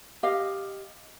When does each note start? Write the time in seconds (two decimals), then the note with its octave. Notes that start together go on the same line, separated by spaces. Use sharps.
0.23 G4 D#5 F5